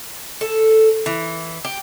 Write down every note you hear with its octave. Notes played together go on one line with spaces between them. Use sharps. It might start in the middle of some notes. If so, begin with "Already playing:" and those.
A4
E3
G4